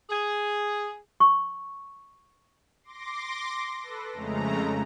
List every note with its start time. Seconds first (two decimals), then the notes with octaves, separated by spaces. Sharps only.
0.10 G#4
1.20 C#6
2.83 C6 D6 A#6
3.80 A4 B4
4.13 F2 C#3 G#3 A3 A#5